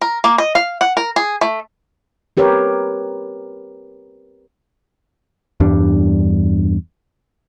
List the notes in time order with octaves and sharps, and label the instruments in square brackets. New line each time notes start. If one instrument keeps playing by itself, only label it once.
[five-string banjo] A#4
A#3
D#5
F5
F#5
A#4
G#4
A3
[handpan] C4 G4 A#4 B4 C#5
[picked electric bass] E2 G2 G3 D4